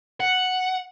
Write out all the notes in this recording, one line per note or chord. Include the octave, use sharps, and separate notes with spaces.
F#5